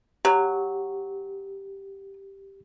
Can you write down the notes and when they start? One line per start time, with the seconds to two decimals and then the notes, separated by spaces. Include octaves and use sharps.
0.25 F#3 G4